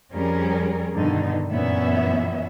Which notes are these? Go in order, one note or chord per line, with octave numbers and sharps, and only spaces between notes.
F2 F3 G3 C#4 G#4 A#4
G2 B2 D3 D#3 D#4
F#2 A#2 E3 B3 C#4 E5